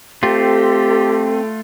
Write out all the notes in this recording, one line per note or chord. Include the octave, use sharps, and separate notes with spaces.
A3 C4 F4 G4 A4